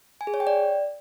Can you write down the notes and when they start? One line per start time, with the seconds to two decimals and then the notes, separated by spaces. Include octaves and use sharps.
0.21 G#5
0.27 G#4
0.34 C#5
0.40 G5
0.47 D5